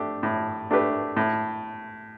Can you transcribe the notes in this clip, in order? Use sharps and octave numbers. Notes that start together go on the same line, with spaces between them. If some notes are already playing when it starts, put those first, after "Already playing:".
Already playing: A3 D4 G4
A2
A3 D4 G4 B4
A2